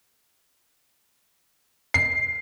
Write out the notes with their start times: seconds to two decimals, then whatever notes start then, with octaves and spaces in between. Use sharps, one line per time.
1.94 C7